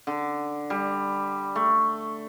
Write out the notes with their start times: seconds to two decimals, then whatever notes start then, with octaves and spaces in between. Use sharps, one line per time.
0.07 D3
0.70 G3
1.56 A3